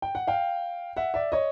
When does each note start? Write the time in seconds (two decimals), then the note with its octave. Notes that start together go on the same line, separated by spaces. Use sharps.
0.02 G5
0.15 F#5
0.27 F5 G5
0.97 E5 F#5
1.14 D5 E5
1.32 C#5 D#5